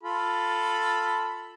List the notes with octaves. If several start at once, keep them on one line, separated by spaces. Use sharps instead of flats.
F4 A4 B5